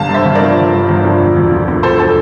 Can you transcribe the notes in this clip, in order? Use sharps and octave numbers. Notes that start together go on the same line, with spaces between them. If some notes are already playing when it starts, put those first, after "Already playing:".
Already playing: G1 G3 F5 A5
G2
C5 E5
G1
A#4 D5
F3
G1
G2
G1
F3
E1
D2
F3
D3
E1 A4 C5
A4 C5